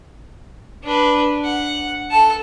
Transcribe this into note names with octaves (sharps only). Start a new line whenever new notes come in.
D4 B4
F#5
A4 A5